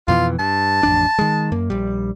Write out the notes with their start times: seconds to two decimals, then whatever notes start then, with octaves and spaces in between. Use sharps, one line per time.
0.08 F2 B2 E3 F4
0.39 G2 A5
0.83 A1 F2 D4
1.19 D#3 G#3
1.52 F#2 A#3
1.70 A#1 G3